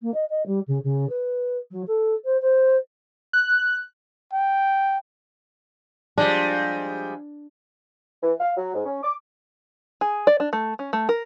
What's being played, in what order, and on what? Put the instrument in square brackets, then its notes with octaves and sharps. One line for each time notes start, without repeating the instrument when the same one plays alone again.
[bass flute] A#3
D#5
D#5
G3
C#3
C#3
B4
F#3
A4
C5
C5
[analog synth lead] F#6
[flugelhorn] G5
[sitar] F3 G3 G#3 [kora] D4
[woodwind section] E3
F5
F#3
G#2
C#4
D6
[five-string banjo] G#4
D5
D4
A3
C#4
A3
A#4